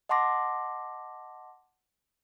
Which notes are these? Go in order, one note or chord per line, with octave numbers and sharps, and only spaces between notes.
D#5 F#5 A5 C6 D6 A#6